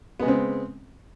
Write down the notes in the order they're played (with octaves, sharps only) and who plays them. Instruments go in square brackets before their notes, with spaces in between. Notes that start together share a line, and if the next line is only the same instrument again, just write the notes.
[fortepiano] B3
G#3
C#3
C4